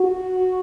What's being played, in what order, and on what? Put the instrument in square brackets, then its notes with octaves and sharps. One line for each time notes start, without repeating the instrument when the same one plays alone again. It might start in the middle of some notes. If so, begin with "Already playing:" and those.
Already playing: [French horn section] F#4